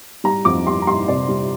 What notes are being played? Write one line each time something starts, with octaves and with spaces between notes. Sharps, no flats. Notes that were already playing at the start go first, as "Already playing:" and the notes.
G3 A#5
F2 D6
G3 C6
A#5
G3 C6
C3 D5
G3